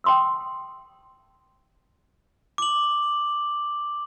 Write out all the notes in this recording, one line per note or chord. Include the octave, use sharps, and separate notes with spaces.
G5 A5 C6 D#6 E6
D6 F#7